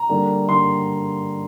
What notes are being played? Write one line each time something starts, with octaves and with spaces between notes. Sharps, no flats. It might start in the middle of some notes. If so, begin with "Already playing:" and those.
Already playing: A#5
D3 G3 A#3
D3 G3 A#3 C6